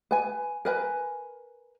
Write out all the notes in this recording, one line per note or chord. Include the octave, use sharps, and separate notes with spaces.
B4 G#5
A#4 B4 G#5